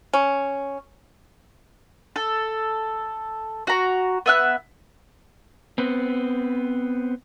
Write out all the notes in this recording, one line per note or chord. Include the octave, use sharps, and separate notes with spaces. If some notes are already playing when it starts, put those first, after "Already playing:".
C#4
A4
F#4 A#5
B3 E5 F#6
B3 C4